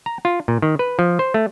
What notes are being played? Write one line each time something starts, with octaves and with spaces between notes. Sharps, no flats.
A#5
F4
A#2
D#3
B4
F3
C5
A3